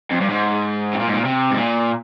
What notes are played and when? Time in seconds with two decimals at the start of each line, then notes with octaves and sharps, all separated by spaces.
0.11 F2
0.20 G2
0.29 G#2
0.93 C3
1.00 A#2
1.08 G#2
1.14 A#2
1.25 C3
1.51 G#2
1.57 A#2